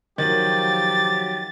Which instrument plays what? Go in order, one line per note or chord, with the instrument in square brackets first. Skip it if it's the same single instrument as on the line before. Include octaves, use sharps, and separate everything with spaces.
[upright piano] D#3 [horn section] F3 F#3 G4 [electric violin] A6